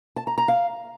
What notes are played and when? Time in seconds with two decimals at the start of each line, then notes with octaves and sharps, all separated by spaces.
0.16 A5
0.27 A#5
0.38 A#5
0.48 F5